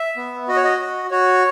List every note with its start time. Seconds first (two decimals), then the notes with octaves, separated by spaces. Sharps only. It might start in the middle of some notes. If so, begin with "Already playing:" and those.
Already playing: E5
0.17 B3
0.48 F#4 D#5
0.56 C#5
0.64 D#5
0.80 F#4
1.11 F#4 C#5